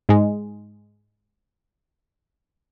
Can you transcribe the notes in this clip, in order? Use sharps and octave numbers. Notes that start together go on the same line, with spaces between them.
G#2 G#3